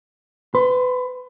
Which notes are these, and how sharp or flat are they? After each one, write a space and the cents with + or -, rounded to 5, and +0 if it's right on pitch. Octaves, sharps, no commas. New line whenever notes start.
B4 +25 C6 +0